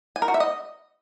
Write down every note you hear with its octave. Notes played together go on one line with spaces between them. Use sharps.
G#5
A#4
F#4
E5
D#5